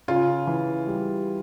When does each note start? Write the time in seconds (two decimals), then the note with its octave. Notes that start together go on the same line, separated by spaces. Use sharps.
0.08 C#3 F4
0.47 E3
0.87 G3